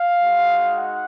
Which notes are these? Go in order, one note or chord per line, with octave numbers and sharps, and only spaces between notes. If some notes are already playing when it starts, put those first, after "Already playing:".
Already playing: F5
G#3 D#4 F#4
F#5